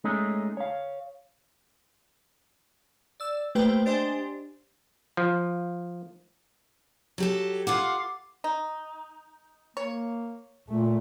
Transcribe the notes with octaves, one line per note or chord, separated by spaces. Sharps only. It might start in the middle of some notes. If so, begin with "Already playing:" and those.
G#3 A3 C#4 D#4
C#5 F5
D5 E6
A3 A#3 G4 B4 C5 G5
D4 G4 C5 D#5 G#5 C6
F3
F#3 G4 A4
F4 F5 F#5 D6
D#4
A#3 C#5
A#2 A3